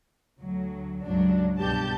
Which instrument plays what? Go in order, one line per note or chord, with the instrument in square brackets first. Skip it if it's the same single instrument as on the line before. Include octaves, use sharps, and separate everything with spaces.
[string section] D2 F#3
C#2 G2 F#3 D4
C2 G2 B2 G4 A5 G6